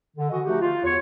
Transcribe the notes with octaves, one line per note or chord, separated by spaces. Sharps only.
D3
E3 F#4 D#5
F3 A3 D#4 F#4 G4
F4
E2 C#5